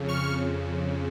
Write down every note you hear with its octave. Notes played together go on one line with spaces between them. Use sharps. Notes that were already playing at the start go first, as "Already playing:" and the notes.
Already playing: F2 C#3
C#6 F6